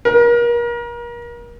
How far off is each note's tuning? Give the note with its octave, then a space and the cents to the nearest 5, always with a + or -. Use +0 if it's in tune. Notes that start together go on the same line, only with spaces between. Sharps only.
A#4 +35